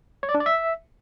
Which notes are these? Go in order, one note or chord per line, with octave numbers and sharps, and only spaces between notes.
C#5
D5
D4
D5
E5